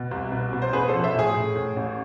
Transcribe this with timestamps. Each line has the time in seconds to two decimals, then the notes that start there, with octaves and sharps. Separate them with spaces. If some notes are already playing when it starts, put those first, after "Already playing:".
Already playing: B2
0.11 C2
0.32 B2
0.53 B2
0.62 C5
0.73 A1 G#4 B4
0.88 A4 C5
0.93 F3
1.04 C5 E5
1.14 A2 G#4
1.35 A2
1.55 A2
1.76 A1